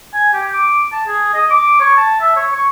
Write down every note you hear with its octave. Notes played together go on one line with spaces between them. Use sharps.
G#5
G4
D6
A5
G#4
D#5
D6
C#5
A5
E5
C#5
C#6